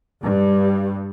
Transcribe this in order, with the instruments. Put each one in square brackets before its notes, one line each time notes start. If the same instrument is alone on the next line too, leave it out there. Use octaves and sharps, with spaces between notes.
[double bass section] G2 G3